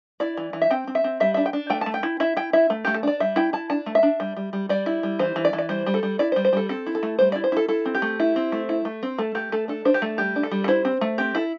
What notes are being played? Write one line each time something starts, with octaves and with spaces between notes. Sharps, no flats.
E4 D5
E3
E3
E5
C4 G5
C4
E5
C4
G3 E5
D4 E5
G5
D4
A3 G5
A3 A5
G5
E4
E4 E5
E4 G5
E4 E5
A3
A3 G4
A4
D4 D5
G3 E5
E4 G5
E4 A5
D4 A5
A3
E5
D4
G3
G3
G3
G3 D5
E4
G3
E3 C5
E3
D5
E3
D5
G3 C5
G3
A4
G3
E4 D5
C5
G3
C5
G3 A4
C4 A4
E4
A4
A3
G3 C5
E4 D5
C5
E4 A4
E4 A4
C4
G4
A3
E4
C4
A3
E4
A3
C4
A3 A4
A3 G4
A3 A4
D4 A4
D4 C5
G4
A3 A4
G3 G4
D4
A4
G3
A4
E4 C5
C4
A3
C4 G4
E4 A4